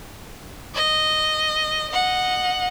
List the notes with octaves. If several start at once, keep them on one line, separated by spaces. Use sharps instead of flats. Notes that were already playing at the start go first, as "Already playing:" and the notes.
D#5
D#5 F#5